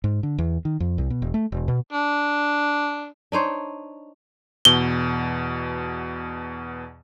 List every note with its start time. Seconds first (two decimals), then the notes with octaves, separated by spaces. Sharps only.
0.04 G#2
0.23 D3
0.38 E2
0.65 D#3
0.80 F2
0.98 C2
1.10 B2
1.22 E1
1.34 A3
1.52 E1
1.68 B2
1.92 D4
3.32 D4 D#4 C5 C#5
4.65 E2 B2 G7